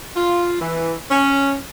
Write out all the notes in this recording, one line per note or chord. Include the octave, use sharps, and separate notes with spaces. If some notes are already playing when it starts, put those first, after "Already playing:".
F4
E3
C#4